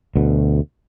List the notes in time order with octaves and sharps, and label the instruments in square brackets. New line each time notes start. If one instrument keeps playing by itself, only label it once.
[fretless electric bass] D2 B2